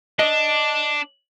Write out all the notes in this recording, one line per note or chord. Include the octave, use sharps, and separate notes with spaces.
D4 D#5